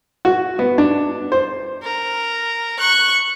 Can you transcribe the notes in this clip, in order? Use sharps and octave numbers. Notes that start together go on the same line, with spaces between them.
F#4
B3
D4
C5
A#4
C#6 F#6